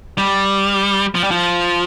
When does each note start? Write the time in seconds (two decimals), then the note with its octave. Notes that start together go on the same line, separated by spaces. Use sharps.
0.18 G3
1.15 F3
1.24 G3
1.31 F3